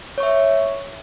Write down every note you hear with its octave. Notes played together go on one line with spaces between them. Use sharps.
C#5 E5 C#6